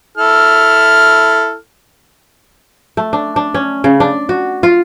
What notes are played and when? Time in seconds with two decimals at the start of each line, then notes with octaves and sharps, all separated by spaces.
0.17 E4 A4 F6
2.97 A3
3.13 D4
3.36 D4
3.54 C#4
3.84 C#3
4.00 D4
4.29 F#4
4.63 F4